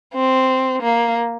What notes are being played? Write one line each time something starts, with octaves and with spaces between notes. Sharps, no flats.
C4
A#3